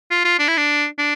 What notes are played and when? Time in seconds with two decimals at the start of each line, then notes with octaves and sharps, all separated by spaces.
0.10 F4
0.25 F4
0.39 D4
0.48 E4
0.57 D4
0.98 D4